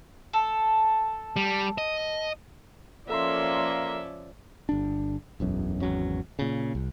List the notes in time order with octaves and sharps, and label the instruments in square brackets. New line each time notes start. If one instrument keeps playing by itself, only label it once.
[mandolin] A4
[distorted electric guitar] G3
D#5
[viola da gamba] F3 C#4 D5 [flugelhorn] A#3 [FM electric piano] A4 A#5 C6 [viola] E5
[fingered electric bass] G1 D4
E1 B1 F#2
G#1 E2 F#3 C#4
A#2 C#3
C2